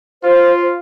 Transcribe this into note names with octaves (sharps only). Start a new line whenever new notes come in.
F4 C5